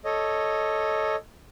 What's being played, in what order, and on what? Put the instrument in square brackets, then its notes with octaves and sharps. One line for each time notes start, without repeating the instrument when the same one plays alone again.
[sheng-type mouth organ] A4 C#5 D#5